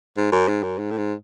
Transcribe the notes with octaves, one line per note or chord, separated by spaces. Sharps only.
G#2
F#2
G#2
F#2
G#2
A2
G#2